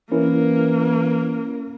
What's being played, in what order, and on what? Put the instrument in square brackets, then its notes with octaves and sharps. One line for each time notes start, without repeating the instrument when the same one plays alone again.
[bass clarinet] E3 [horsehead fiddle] A#3 [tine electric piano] C#4 E4 A#4